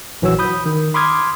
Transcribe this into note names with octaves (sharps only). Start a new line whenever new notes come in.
A#1 E3 F#3 F#4 C#5 E6
B5 D#6 G6
D#3
B5 C6 D6 D#6 F6 G#6